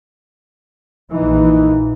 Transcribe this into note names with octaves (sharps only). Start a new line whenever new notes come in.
A#1 E3 D#4